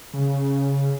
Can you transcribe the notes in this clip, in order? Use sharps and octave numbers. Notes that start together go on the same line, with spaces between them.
C#3